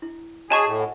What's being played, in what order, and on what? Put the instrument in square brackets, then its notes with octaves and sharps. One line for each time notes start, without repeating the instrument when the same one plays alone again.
[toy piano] E4
[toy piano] F#4 C#5 D#5 [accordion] G#4 [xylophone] G#5 A5 C#6
[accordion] A2
[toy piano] F#5